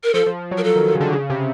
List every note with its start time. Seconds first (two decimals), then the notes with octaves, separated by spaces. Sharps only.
0.04 A#4
0.14 F3 A4
0.26 F3
0.51 F#3
0.58 A#4
0.64 A4
0.76 D#3
0.88 D#3
0.95 C#3
1.01 D3
1.13 C#3
1.30 C3